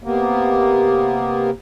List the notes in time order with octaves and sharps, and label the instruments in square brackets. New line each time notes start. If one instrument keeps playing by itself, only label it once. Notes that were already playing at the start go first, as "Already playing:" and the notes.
[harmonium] C3 A#3 B3